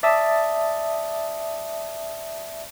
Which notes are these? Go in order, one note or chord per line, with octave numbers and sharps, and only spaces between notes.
D5 E5 A5 D#6